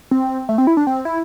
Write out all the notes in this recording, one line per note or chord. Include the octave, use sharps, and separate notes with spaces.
C4
A3
C4
E4
D4
C4
E4